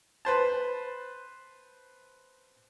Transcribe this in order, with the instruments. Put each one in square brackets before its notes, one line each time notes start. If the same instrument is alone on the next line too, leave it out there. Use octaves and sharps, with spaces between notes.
[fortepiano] B4 C5 A5